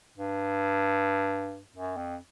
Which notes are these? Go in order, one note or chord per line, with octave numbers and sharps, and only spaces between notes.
G2
F#2
F2